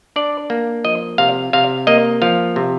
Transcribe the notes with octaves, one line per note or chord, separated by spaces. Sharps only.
D4 D5
A#3
F3 D#5
C3 F5
C3 F5
A#3 D#5
F3 F5
C3